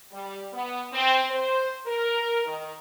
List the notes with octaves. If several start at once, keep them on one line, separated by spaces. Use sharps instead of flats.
G3
B3
C4
C5
A#4
D#3